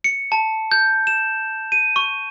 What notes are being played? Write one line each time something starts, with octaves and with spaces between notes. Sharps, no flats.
C#7
A5
G6
E7
D#7
C#6